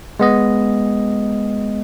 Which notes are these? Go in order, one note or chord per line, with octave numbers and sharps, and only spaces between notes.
G#3 B3 D#5